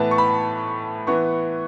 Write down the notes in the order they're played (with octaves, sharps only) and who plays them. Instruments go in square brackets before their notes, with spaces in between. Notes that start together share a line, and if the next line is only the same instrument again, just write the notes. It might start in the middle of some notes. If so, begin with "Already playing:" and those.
Already playing: [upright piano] A2 E3 B3 A5
C#6
B5
E3 B3 C#6